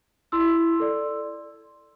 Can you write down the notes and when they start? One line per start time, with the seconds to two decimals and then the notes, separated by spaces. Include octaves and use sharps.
0.32 E4 C6 E6
0.80 A4 D5